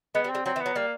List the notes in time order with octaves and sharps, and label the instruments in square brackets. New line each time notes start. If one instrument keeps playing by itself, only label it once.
[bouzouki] G#3 [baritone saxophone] B3
[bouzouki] G3
[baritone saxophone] C4
[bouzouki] G3
[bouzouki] F#3 [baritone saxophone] C4
[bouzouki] E3
[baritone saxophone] B3
[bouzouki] F#3
[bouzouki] G3 [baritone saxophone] A#3